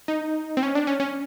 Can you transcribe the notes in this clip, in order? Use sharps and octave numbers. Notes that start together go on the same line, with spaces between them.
D#4
C4
C#4
D4
C#4
C#4